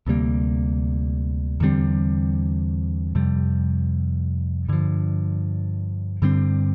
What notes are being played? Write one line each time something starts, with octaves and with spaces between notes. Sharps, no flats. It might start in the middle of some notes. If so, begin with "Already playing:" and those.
D2 C3 G3 A#3
E2 D3 G3 C4
F2 C3 G3
G2 D3 F3
G2 D3 G3 C4